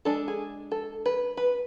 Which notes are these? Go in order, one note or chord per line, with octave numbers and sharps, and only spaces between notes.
G#3 D4 A4
G#4
A4
B4
B4